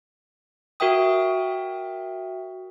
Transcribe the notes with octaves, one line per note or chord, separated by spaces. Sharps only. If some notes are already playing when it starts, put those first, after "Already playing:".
F#4 A#4 E5 G5 D#6